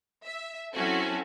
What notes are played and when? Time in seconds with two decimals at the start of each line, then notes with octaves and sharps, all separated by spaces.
0.24 E5
0.75 F#3 C4 C#4 E4 F#4 A4